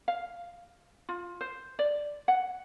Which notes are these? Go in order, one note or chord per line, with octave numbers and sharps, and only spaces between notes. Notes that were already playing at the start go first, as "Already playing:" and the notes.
F5
F4
C5
D5
F#5